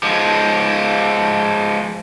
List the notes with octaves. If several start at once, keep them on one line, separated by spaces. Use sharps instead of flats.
F3 G#3